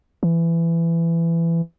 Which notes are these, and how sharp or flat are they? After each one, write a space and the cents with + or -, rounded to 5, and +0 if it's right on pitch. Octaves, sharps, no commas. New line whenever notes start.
E3 +20